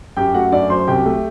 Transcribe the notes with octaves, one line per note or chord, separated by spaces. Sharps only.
F#2 G4 G5
A3 F#4 F#5
F#2 D4 D5
F#3 C5 C6
C2 G4 G5
A3